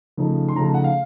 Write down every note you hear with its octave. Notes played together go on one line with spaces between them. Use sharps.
C#3 F3 A3 D#4
C6
C#3 F3 A3 D#4 A#5
A5
F#5
F5